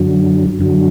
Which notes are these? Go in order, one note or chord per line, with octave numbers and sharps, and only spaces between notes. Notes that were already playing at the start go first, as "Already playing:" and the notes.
Already playing: F#2 D3 F#3
F#2 D3 F#3